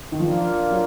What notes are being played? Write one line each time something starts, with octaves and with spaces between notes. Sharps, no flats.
D#3
F3 A#3 D4 F4 A#4
F#3